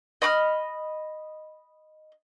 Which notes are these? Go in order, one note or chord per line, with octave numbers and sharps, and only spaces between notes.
D#5 B5 D6 F6